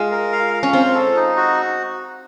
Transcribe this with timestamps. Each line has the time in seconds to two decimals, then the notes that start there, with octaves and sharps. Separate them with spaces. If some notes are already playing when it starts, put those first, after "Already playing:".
Already playing: G#3 F4
0.11 A#4
0.32 F5
0.54 F5
0.63 C#4
0.73 C4 F4
0.95 A4
1.16 D#4
1.37 F#4